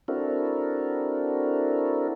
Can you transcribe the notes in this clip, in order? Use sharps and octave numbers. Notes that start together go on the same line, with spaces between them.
C4 D4 E4 F#4 A4 A#4